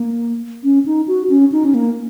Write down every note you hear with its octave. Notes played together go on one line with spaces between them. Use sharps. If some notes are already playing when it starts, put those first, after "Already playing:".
Already playing: A#3
C#4
D#4
F#4
C#4
D#4
C#4
A#3